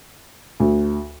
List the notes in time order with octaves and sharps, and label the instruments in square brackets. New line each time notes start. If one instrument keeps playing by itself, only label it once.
[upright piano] D2